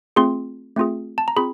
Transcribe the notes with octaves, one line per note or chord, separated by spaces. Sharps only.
A3 C4 F4 G#4 C6
A3 C4 F4 G#4
A5
A#5
C4 F4 G#4 B5